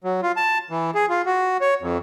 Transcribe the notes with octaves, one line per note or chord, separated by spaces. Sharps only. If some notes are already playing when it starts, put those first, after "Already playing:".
F#3
F4
A5
E3
G#4
F4
F#4
C#5
F2